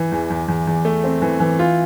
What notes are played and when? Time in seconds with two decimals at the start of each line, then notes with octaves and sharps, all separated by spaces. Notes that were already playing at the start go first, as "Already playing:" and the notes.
Already playing: E3
0.12 E2
0.30 E2
0.48 E2
0.67 E2
0.85 A3
1.04 C4
1.22 E3
1.40 E3
1.59 F4